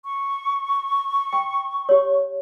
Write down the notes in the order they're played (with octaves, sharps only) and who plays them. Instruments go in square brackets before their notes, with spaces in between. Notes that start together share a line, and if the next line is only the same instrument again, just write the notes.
[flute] C#6
[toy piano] G5 C6
G4 C#5